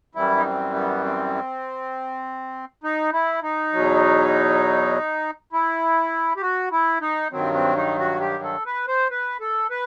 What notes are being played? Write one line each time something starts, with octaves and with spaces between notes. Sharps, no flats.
F#2 E3 G3 E4
D#4
C4
B3
C4
D#4
E4
D#4
E2 B2 F#3
E4
G4
F#4
E4
D#4
G2 D#3 F#3 C4
C4
D#4
F#4
G4
A4
B4
C5
B4
A4
B4